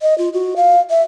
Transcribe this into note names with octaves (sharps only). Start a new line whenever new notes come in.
D#5
F4
F#4
F5
E5